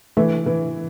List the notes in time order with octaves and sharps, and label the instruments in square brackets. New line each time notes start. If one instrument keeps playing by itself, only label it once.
[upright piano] E3 [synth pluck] A3
[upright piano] E3